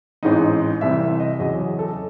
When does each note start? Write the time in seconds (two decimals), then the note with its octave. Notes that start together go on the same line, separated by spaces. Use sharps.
0.23 A1 G#2 E3 C4 D#4
0.81 C2 C3 E3 C4 E5
1.01 E5
1.20 D#5
1.39 E2 C#3 F#3 C#4 D#5
1.79 A4